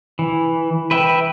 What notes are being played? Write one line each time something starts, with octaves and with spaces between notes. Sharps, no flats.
E3
B4 E5 G5